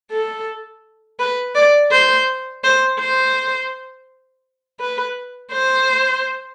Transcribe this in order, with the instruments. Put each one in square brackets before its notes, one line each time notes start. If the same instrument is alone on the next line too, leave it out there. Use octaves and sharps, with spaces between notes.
[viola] A4
B4
D5
C5
C5
C5
B4
C5